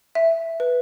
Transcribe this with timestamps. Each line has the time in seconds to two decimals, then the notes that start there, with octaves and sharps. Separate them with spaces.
0.15 E5
0.60 B4